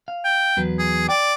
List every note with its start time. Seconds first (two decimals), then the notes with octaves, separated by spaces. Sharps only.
0.08 F5
0.25 G5
0.57 E2 F#3 B4
0.79 G#4
1.09 D5 G5